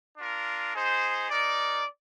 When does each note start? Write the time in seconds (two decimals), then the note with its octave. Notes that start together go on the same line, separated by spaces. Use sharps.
0.17 D4 F4 A#4
0.74 D#4 G#4 C5
1.30 D#4 A#4 D5